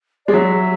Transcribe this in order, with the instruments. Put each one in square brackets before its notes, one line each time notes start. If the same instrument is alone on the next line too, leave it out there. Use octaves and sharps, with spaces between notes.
[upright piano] G#3 [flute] D5
[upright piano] F#3 [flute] E5